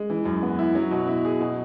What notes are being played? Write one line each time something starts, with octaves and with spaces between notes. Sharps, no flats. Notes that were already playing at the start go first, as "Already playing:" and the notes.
Already playing: G#3
E3
F#2
B3
E4
F#3
B2
E4
G#4
B2